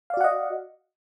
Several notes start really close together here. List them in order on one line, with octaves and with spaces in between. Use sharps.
F5 D5 F#4 F#5 D#5